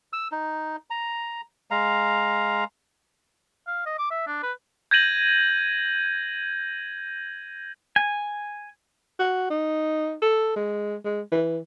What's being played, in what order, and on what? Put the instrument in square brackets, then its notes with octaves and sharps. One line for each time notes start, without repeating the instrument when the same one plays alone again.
[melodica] E6
D#4
A#5
G#3 F5 A#5
[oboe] F5
D#5
D6
E5
D4
B4
[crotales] G6 G#6 A#6 D#7 F#7
[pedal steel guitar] G#5
[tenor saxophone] F#4
D#4
A4
G#3
G#3
E3